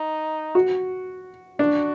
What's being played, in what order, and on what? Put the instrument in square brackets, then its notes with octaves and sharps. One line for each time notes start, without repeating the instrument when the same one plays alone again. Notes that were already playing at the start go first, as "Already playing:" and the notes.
Already playing: [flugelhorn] D#4
[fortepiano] F#4
[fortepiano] D4 [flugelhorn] F#4